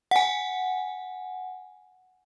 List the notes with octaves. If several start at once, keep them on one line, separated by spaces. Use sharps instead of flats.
F#5 G#5